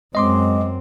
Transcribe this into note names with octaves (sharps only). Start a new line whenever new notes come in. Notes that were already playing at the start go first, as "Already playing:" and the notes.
F#2 G#3 C4 D#5 C6 D6